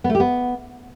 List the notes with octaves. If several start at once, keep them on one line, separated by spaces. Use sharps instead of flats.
B3
A3
G4
B3